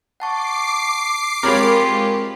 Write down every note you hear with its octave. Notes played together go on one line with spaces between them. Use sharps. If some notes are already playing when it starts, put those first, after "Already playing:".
F#5 A5 C#6 D6 C7
G#3 C4 F4 G4 G#4 A#4 C#5 B5